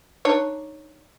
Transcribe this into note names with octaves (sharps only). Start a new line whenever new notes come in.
D4 D#4 C#5